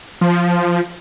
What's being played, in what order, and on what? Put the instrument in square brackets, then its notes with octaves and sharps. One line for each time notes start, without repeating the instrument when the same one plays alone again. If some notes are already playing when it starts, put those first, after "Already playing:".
[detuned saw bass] F3